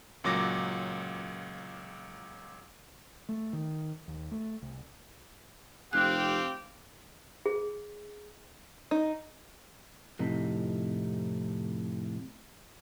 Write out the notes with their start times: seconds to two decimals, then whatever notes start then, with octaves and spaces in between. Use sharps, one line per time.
0.24 C#2 A#2 F#3 D6 A#6
3.29 A3
3.53 D#3
4.08 D#2
4.31 A3
4.62 C2
5.93 F1 C4 G4 F5 F#6
7.46 G#4
8.91 D#4
10.19 F2 A2 C3 D#4